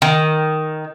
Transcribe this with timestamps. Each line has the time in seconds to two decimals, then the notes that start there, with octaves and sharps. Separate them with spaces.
0.02 D#3